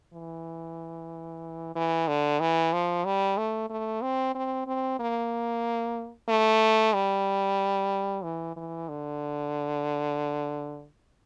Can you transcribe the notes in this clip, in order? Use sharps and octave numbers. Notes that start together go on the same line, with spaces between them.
E3
E3
D3
E3
F3
G3
A3
A3
C4
C4
C4
A#3
A3
G3
E3
E3
D3